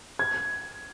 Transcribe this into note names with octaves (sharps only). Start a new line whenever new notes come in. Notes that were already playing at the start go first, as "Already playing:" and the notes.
G#6